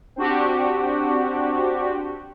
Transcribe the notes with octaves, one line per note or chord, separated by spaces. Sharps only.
C4 D4 F#4 G4